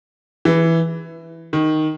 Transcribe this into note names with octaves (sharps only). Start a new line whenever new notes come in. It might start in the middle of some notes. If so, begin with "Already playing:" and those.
E3
D#3